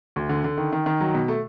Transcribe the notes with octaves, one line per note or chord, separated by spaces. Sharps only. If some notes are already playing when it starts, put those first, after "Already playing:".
D2
D3
D3
D#3
D#3
D#3
F#3
B2
A3